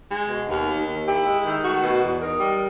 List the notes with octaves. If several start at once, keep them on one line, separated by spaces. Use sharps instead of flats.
G#3
B2
D#2
D#3
D#2
E4 G4
G#3
D#3
A3 F#4
B2
E2
D#4 A#4
G3